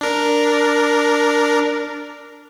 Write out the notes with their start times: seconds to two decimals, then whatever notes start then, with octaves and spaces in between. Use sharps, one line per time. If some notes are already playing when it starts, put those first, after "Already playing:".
0.01 D4 A#4